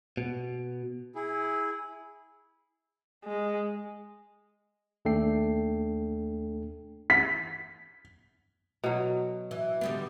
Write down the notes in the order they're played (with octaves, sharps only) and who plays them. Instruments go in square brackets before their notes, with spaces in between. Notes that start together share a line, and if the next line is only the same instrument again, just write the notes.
[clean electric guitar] B2
[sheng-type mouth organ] E4 G#4
[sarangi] G#3
[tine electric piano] D#2 A3 D4 A4 G5 C7
[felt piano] B6
[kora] B2 F#3
[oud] E3
D3 G3 B3